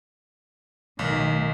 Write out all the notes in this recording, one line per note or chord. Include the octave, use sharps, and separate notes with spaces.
B1 A2 D#3